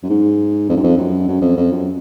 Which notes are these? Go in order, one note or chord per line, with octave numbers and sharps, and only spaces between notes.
F#2
G#2
F2
F#2
F2
F#2
F#2
F2
F2
F#2